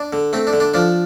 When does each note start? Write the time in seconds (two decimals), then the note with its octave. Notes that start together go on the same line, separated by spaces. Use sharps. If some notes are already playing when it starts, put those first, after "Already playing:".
Already playing: D4
0.13 D3
0.33 A3 C4
0.47 D4
0.53 D3
0.60 D4
0.74 F3 D4